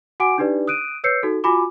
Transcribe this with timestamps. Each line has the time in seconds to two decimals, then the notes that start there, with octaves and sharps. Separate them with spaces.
0.20 F#4 F#5 G#5 D6 D7
0.38 D4 D#4 G4 B4 D5
0.67 D#6 F#6 D7 D#7
1.04 B4 C#5 E6 G6 C7 C#7
1.23 D#4 F#4 A4
1.44 F4 F#4 G#5 B5 D6